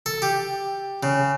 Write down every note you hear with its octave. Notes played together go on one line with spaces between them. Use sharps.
A4
G4
C#3